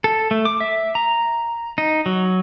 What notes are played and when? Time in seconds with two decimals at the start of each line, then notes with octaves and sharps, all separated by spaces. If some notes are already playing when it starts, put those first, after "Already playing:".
0.04 A4
0.31 A3
0.45 D6
0.60 E5
0.95 A#5
1.78 D#4
2.06 F#3